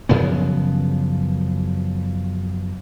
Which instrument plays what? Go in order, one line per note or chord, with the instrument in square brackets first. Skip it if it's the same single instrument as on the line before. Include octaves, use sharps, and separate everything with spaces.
[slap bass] F#2 C#3 F3 B3